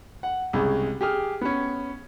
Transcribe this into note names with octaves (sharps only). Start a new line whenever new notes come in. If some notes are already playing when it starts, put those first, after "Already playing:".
F#5
C2 C#3 G#3
G4 G#4 F6
B3 C#4